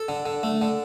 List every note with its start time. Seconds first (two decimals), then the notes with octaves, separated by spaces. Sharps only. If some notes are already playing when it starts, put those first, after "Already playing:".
Already playing: A4
0.08 D3
0.26 D3
0.43 A3
0.62 D3